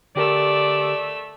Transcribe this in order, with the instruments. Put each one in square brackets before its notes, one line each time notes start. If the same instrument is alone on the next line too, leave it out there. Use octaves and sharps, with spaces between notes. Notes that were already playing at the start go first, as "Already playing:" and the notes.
[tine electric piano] D3 G4 A#4 [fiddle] A3 E6 [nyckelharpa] D5